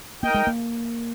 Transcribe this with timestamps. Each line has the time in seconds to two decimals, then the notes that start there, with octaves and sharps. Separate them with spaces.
0.23 A#3 D#4 A#4 D#5 G5
0.34 G#3
0.47 A#3